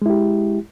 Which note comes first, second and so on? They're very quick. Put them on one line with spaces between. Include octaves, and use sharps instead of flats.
G#3 E4 G4